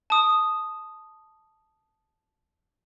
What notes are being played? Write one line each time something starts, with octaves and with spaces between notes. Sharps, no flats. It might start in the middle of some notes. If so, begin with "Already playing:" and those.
A5 D#6